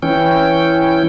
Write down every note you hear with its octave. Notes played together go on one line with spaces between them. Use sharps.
E3 C#4 G5